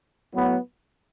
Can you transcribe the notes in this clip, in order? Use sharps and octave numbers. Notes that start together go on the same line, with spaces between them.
A2 F#3 B3